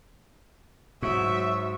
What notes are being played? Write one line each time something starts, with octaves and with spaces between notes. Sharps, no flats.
G#2 F#3 E5 C#6